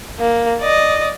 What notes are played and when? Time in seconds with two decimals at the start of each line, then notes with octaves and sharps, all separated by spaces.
0.19 A#3
0.60 D5 D#5